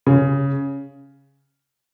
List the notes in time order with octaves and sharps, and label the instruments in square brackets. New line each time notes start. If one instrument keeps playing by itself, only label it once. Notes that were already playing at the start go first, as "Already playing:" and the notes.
[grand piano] C#3